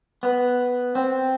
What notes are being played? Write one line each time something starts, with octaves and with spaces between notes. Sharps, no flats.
B3
C4